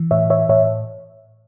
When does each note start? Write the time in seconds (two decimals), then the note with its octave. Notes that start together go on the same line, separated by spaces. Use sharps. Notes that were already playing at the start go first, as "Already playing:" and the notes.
Already playing: E3
0.11 A2 C#5 E5
0.30 C#5 E5
0.49 A2 C#5 E5